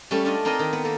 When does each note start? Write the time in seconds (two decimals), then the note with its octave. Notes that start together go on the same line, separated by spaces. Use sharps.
0.11 G3 A3 C#4 A5
0.25 D4 F4 D#5
0.45 C4 D#4 A#4 D5 D#5 G#5
0.59 D#3
0.73 B3
0.85 A#3 A4